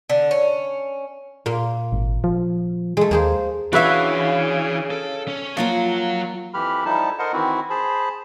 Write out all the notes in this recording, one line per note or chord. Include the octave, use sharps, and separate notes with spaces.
D3
C#4
A#2 A#3 C6
G#1
F3
G#3 A3
D#2 A#3 G#4 C5
C#3 E3 D4 F#4 B4 E5 F5
A4
C#4
F3 F#3 A#3 F4 C#5
F2 E3 G4 B5 F6
F3 G3 D#4 E4 A4 A5
A4 A#4 C5 D#5 F#5
D#3 E3 C4 E4 F#4
G#4 C5 A5 B5